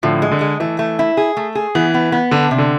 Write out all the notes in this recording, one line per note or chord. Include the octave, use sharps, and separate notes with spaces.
A2 D3 F3
G#3
D3
G#3
E3 A3
A3
E4
G#4
A3
G#4
E3 B3
B3
B3
D3 D4
C3
D3